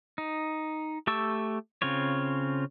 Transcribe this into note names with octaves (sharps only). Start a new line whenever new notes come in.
D#4
A3 G4 A5 C#6 E6
C#3 C4 F4 C#5